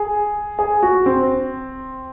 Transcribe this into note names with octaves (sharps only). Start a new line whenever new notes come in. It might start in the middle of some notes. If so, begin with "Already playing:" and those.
Already playing: G#4
G#4
F#4
C4